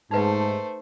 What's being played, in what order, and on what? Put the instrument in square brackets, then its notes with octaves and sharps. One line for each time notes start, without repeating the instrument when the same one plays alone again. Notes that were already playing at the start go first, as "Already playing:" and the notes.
[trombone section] G#2 [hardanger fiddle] A3 C5 [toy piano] D#4 B4